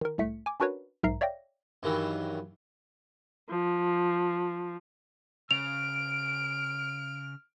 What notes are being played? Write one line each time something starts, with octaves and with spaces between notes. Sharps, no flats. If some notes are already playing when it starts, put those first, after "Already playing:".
D#3 A#4
C2 A2 A3 B6 C#7
G#5 D6
C#4 D4 F#4 A#4 B4 C#5
B1 G#2 A#4 E5 A#5 C7
C#5 D5 E5 F5 G5 A#6
G2 D#3 E3 F#3
F3
C#3 F6 D7 F7